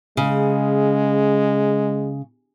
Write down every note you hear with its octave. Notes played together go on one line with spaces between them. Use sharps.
C#3 G#3